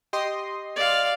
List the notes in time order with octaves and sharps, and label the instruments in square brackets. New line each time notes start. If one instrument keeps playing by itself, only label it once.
[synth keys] G4 D#5 C6
[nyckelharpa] D5 F5